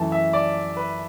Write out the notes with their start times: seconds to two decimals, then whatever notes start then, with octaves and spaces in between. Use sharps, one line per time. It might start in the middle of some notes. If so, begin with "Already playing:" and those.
Already playing: F#2 E3 A3 A5
0.12 E5
0.33 D5
0.77 B4